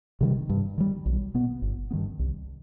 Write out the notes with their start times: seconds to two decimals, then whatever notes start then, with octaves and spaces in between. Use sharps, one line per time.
0.21 C3 D#3 G3
0.49 G2
0.78 D#3 G3
1.06 B1
1.34 B2 B3
1.62 G1
1.91 B3
1.93 G2 D#3
2.19 C2